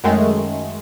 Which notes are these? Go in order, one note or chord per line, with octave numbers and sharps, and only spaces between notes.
F#2 D#3 G#3 A3